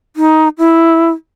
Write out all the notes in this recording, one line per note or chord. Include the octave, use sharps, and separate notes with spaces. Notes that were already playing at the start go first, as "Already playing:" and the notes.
D#4
E4